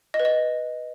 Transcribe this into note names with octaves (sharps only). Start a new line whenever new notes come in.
D#5
B4
D#5